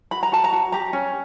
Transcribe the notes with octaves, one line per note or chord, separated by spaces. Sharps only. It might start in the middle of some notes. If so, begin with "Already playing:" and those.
F#4 B5
A#5
F#4 A5
A#5
F#4
G4 A#5
C#4